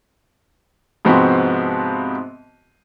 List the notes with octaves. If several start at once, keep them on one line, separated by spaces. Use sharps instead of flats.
G#2 C3 F3 B3 C4 F#4